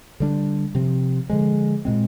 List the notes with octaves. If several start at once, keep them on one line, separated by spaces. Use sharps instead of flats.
D3 G3 D4
C3 F3 C4
D3 F3 G#3
A#2 G#3 C4